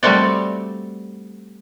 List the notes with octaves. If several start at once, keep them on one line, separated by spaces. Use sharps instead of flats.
G3 A3 C4 F#4 D5